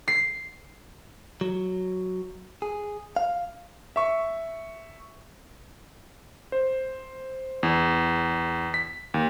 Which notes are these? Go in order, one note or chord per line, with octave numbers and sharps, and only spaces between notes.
C7
F#3
G#4
F5
E5 C#6
C5
E2
B6
D#2